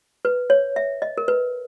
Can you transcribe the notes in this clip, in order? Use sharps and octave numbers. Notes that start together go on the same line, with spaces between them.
B4
C#5
E5
D#5
A#4
B4